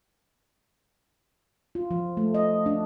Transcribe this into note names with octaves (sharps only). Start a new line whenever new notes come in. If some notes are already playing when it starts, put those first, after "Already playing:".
F4
F3
A3
D#5
D4